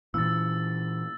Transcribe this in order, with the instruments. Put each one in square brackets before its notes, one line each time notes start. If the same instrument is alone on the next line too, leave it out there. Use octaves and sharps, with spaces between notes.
[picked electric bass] A#2 E3 [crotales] E6 A6